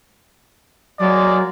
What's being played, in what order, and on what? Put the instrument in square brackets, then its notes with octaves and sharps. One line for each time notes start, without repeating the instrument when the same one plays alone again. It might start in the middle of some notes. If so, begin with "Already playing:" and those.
[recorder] F#3 [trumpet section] G#3 A#3 D5